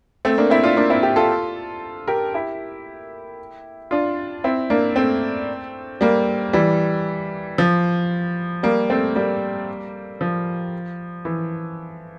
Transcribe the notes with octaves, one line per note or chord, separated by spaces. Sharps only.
A3 C4
A#3 D4
C4 E4
D4 F4
A#3 D4
C4 E4
E4 G4
F4 A4
G4 A#4
E4 G4
D4 F4
C4 E4
A#3 D4
A3 C4
G3 A#3
E3 G3
F3
G3 A#3
A3 C4
G3 A#3
F3
E3